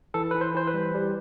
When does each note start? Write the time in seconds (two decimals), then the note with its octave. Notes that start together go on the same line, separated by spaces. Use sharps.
0.14 E3 A4
0.31 E3 B4
0.41 C5
0.55 E3 C5
0.67 B4
0.74 G3
0.94 G3